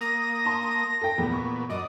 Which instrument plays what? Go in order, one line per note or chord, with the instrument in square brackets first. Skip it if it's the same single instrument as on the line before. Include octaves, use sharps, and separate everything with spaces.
[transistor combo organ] A#3 D#6 [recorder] A#6
[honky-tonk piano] A5 C6
A4 G5
[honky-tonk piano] E2 [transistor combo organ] A#2 B3
[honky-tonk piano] C#6
[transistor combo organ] F#2 D5 [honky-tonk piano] D#5 [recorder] D#6